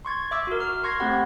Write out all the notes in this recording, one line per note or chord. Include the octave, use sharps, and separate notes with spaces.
C6 C#6 G#6 A6
E5 D6 E6
F#4 A#4
F6
C6 C#6 G#6 A#6 C7
A3 C4 G4 F#5 B5